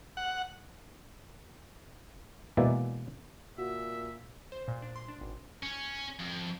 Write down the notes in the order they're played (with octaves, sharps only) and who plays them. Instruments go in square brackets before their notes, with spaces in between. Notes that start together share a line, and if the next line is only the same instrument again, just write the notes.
[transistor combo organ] F#5
[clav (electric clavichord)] B2 E3 G#3 A#3 D5 E5
[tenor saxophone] A#2 [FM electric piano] F#4 [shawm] E5
[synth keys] C5
A#2
D4
C6
D4
G#1
[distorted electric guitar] C#4
F2